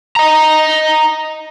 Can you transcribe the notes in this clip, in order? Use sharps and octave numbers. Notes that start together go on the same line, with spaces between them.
D#5 A#5